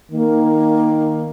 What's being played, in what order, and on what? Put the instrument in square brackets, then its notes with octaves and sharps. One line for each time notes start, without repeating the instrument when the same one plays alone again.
[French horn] D#3 [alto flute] A#3